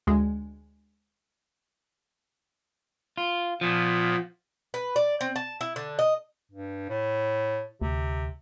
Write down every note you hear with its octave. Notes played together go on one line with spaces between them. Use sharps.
D2 G#3
F4
A#2 F3 B3
B4
D5
C4
A5
E4
D3
D#5
G2
A2
D2 C3